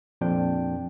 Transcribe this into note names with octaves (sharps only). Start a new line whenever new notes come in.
F2 A#2 F3 C4 D4 G5